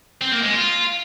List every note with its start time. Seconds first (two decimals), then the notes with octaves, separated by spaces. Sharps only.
0.21 C4
0.32 A#3
0.42 G#3
0.53 F4